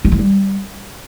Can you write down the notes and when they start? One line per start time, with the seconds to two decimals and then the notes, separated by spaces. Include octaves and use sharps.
0.05 G3
0.12 E3
0.19 G3